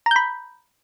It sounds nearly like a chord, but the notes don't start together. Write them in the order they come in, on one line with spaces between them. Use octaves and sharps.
A#5 G6 B5